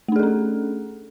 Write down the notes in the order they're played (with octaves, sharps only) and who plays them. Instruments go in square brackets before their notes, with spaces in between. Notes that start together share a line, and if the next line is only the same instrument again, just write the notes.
[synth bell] A3
D4
G#4
A4
C#4